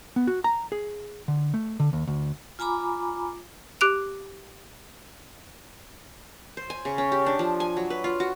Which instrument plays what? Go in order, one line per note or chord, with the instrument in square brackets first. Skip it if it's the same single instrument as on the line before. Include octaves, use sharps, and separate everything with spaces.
[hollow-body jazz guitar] B3
F#4
A#5
G#4
D3
A3
D3
D#2
D2
[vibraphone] F4 G#5 A#5 B5 D6
[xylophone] G4 D6 F#6 D7 F7
[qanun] C5
G#5
C#3
C#4
G4
D4
F3
G#5
F#3
B4
F4
F#4